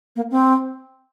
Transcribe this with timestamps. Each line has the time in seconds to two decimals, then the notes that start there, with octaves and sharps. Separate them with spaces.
0.16 A#3
0.31 C4